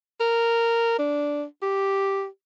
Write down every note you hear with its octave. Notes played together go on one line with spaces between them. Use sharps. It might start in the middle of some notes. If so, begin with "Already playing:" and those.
A#4
D4
G4